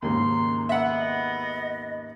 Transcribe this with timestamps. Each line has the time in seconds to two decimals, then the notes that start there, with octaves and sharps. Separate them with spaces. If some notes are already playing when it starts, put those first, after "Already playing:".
0.02 D#2 G#2 C#3 A#5 C6
0.69 B3 E5 F#5
0.97 D#5